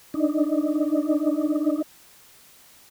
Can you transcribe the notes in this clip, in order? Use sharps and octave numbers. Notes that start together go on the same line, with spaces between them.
D4 D#4